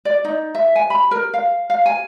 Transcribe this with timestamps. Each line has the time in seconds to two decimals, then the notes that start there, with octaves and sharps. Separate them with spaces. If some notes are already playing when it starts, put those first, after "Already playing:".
0.05 D5
0.25 D#4
0.55 E5
0.76 G#5
0.90 B5
1.11 A#4
1.34 F5
1.70 F5
1.86 G#5